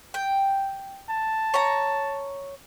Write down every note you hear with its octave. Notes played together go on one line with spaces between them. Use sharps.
G5
A5
C#5 A#5